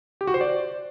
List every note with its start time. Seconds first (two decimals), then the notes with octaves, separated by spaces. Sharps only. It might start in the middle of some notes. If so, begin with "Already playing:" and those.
0.21 G4
0.27 F#4
0.34 C5
0.41 D5